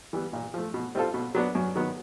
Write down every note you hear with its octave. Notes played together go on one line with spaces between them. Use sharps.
E3 G3 B3
A#2
F3 A3
B2
G3 C4 F4 A4
B2
F#3 B3 D4
F#2
D#3 F#3 B3